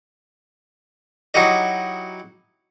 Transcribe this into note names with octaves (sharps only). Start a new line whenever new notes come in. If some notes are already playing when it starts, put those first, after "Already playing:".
F#3 D#4 E4 F#4 G4 D#5